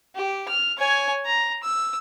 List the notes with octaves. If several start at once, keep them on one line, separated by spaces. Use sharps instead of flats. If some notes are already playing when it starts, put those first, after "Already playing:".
G4
F6
C#5 G#5
A#5
E6